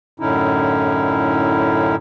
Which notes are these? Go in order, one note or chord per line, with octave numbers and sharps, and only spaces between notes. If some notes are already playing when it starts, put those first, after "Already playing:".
F#2 A2 D3 C#4 D#4 E4